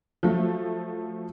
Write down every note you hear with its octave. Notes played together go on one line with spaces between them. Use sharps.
F3 F#3 A3